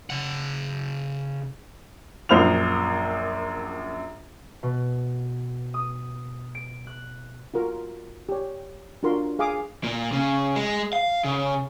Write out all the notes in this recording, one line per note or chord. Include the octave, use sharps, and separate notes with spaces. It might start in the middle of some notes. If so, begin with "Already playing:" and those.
C#3 F#5
A#1 F#2 C5 F6 F7
B2
D#6
D7
F#6
F4 F#4 A#4
G4 C#5
D4 F4 F#4 A#4 C6
G#4 F5 G#5 D6 D#6
A#2
C#3
G#3
F5
C#3